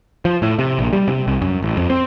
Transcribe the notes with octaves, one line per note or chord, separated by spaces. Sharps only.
F3
A2
C3
A#1
G3
C3
C2
F#2
A1
F2
C4